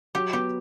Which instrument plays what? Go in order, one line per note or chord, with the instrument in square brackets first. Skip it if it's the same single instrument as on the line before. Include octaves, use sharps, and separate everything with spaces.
[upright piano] F#3 [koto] G4
[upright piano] B3 [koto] G4